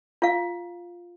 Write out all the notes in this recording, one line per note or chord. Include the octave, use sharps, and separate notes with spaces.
F4 F5